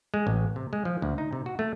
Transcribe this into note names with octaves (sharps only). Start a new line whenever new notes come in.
G#3
A1
C3
G#3
F3
D2
D#4
C3
F#4
A3